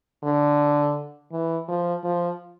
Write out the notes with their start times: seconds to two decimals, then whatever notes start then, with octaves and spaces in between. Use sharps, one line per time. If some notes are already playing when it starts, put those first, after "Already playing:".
0.24 D3
1.32 E3
1.68 F3
2.04 F3